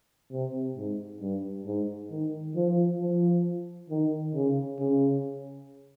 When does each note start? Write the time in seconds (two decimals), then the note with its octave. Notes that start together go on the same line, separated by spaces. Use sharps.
0.32 C3
0.77 G#2
1.21 G2
1.66 G#2
2.11 D#3
2.55 F3
3.00 F3
3.90 D#3
4.34 C#3
4.79 C#3